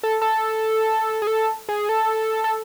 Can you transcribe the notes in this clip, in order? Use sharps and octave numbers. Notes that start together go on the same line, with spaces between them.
A4
A4
G#4
A4
G#4
A4
A4